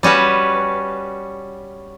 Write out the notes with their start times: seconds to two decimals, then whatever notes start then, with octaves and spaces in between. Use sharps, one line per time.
0.03 G3 C#4 F#4 B4